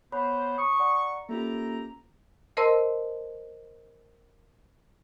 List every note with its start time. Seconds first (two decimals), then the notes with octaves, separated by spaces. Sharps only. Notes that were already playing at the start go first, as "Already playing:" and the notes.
0.12 B3 C5 C#5 B5 F#6
0.58 A#5 C#6 D#6
0.79 D5 F#5 A#5
1.29 A#3 C#4 F4 G4 A4 A#5
2.57 A#4 C5 D#5 A5 C6 E6